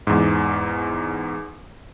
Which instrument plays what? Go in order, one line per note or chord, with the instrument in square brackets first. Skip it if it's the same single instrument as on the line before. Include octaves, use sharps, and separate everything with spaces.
[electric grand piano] E2 G#2